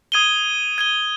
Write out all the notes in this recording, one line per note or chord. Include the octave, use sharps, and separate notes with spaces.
D#6 G#6 D#7 G7
G#6 D#7 G7